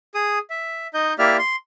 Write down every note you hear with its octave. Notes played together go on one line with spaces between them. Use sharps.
G#4 D#6
E5
D#4 D#5 G6
A#3 E4 G4 D5 E5 F6
C6